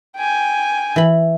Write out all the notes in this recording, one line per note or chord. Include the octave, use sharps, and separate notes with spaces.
G5 G#5
E3 B5